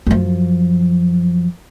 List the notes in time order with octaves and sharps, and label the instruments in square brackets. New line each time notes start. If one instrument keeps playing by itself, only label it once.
[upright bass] F#2 F3